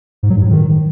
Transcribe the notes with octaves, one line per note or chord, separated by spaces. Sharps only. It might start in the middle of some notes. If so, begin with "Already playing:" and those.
G#2
F#3
G2
A2
D#3